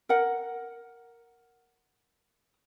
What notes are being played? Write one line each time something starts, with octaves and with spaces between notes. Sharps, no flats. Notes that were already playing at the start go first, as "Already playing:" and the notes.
A#4 F#5